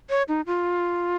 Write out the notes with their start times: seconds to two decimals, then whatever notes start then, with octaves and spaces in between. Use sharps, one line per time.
0.10 C#5
0.28 D#4
0.47 F4